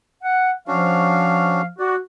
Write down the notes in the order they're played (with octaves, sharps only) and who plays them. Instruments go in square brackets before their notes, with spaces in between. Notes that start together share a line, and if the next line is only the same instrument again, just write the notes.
[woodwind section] F#5
[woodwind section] F3 F5 [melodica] C#4 D4 F#4
[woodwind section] F#4 [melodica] D5